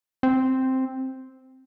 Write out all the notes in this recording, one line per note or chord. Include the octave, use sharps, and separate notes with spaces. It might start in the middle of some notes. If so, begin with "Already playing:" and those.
C4